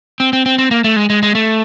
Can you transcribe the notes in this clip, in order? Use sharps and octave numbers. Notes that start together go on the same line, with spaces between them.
C4
C4
C4
C4
A#3
A3
G#3
G#3
G#3
A3